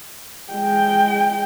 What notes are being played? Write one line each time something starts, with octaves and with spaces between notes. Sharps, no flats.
G#3 G5